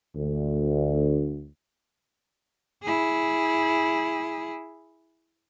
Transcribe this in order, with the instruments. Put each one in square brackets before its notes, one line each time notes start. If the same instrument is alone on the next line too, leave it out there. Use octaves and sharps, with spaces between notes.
[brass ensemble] D2
[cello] E4 G#4